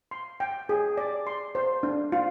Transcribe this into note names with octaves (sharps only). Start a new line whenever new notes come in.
C6
G5
G#4
D5
C6
C5
D4
F4